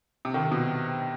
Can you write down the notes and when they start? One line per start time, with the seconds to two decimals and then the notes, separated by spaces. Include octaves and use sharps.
0.25 C3
0.34 D#3
0.43 C3
0.52 B2